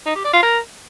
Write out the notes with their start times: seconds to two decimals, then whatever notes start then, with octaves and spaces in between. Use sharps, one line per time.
0.06 D#4
0.15 G4
0.24 D5
0.34 F4
0.43 A#4